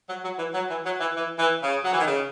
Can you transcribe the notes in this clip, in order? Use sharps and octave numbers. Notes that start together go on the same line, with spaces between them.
F#3
F#3
E3
F#3
E3
F#3
E3
E3
E3
C#3
F#3
E3
D#3
C#3